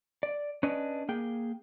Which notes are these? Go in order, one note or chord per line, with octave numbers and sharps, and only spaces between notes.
D5
C#4 D4 B4 D5 D#5
A#3 G#4 G5